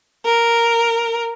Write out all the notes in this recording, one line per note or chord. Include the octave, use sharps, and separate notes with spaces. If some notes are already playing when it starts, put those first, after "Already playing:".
A#4